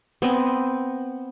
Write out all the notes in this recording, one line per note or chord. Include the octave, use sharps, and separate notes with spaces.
B3 C4 D#5 G#5